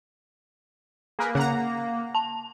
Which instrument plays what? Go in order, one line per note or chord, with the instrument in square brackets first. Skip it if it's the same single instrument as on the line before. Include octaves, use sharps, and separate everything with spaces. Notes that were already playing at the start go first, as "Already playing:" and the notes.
[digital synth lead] A#3 [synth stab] G#4 A#4 B4
[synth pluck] C#3 [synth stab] F#5 A#5
[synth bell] A5